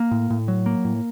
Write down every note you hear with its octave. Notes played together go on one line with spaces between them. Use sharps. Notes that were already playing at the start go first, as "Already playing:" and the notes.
Already playing: A#3
A2
A2
F#3
A#3
A2